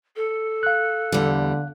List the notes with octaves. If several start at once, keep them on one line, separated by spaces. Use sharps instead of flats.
A4
F5 F#6
E2 D3 G3